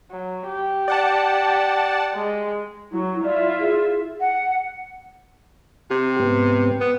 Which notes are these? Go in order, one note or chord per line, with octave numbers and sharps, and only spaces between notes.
F#3
G4
D5 F#5 A5
G#3
F#3 E4
E4 F4 D5 E5
G#4
F#5
C3 G4
G#2 B3 C4
B3